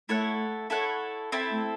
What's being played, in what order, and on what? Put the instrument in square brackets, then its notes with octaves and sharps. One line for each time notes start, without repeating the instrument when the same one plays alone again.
[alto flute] A3 [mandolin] E4 A4 C#5 F#5
[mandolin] E4 A4 C#5 F#5
C4 E4 A4
[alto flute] A3